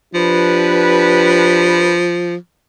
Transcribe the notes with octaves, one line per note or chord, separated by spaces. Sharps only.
F3 D4 G4 B4